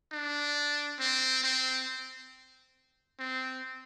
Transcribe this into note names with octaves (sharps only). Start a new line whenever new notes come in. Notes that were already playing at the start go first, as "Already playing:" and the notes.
D4
C4
C4
C4